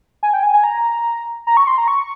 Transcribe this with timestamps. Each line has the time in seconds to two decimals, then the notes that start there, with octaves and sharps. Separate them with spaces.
0.23 G#5
0.33 G5
0.43 G#5
0.53 G#5
0.64 A#5
1.47 A#5
1.57 C#6
1.67 C6
1.78 A#5
1.88 C#6